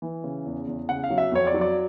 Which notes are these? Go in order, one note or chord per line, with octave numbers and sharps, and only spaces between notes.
E3
C#3
E2
E2
C#3 F#5
F5
F#3
E5
F2 C#5
D5
F#3
D5